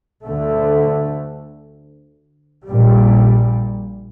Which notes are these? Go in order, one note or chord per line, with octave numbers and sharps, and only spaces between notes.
D2 D3 A3
A#1 A#2 G3